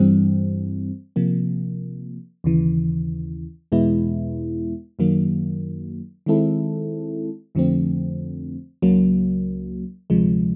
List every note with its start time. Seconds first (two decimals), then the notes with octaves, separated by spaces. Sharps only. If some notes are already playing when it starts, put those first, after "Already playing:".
Already playing: G2 E3 G3 C4
1.16 C3 F3 A#3
2.44 D#2 C#3 E3
3.72 E2 B2 G#3 B3 E4
4.99 F#2 D#3 F#3 A#3
6.26 D#3 G#3 C4 E4 A4
7.55 F2 D3 F3 A3 C4
8.82 C#2 C#3 F#3 A#3
10.10 D2 C3 F3 G#3